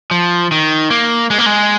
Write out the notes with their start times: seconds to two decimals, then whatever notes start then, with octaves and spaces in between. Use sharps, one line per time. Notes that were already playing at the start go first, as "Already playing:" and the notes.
0.11 F3
0.52 D#3
0.90 A#3
1.31 G#3
1.38 A#3
1.46 G#3